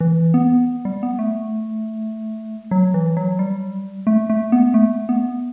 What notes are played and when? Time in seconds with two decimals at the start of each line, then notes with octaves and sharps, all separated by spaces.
0.01 E3
0.34 B3
0.85 G3
1.03 B3
1.19 A3
2.71 F#3
2.94 E3
3.17 F#3
3.39 G3
4.07 A3
4.30 A3
4.52 B3
4.74 A3
5.09 B3